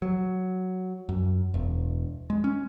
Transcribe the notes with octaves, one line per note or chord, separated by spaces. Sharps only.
F#3
F#2
E1
G#3
C#4